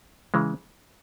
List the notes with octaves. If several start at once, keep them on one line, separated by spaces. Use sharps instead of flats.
C#3 E3 G#3